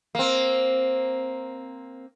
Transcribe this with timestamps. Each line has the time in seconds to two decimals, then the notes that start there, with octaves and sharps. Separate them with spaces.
0.15 A#3 C4